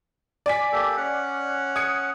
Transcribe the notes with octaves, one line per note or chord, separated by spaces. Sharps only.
D5 G#5 B6
A#3 G4 A4
C#4 F#5
D#6 G#6 C#7